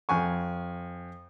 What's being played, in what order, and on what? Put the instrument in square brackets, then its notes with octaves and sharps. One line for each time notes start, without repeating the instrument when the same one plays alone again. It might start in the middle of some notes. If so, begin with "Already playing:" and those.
[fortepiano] F2 G#5 C#6